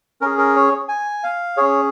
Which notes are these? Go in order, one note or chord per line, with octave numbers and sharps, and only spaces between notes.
C#4 G#4 A#4
A#4
C#5
G#5
F5
C#4 G#4 C#5